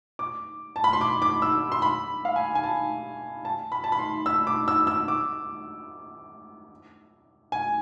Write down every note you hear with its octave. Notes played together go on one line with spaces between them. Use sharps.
D6
A5
B5
C6
D6
D6
E6
C6
B5
F5
G#5
G#5
A5
A5
B5
A5
B5
C6
E6
D6
E6
E6
D6
G#5